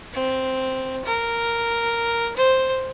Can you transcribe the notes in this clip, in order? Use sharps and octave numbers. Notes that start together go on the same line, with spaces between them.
C4
A#4
C5